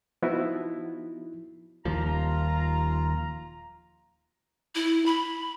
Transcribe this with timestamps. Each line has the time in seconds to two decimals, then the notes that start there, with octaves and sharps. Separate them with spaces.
0.22 F3 B3 D#4 E4 F#4
1.85 D#1 D#2 F3 F4 A#5
4.75 E4
5.06 B5